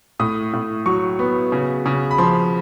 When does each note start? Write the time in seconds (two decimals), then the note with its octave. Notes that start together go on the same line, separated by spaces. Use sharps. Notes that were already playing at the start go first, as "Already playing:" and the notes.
0.19 A2 D#6
0.53 A2
0.86 F#3 C#6
1.19 B3
1.52 C#3
1.86 C#3
2.11 B5
2.18 F3 C6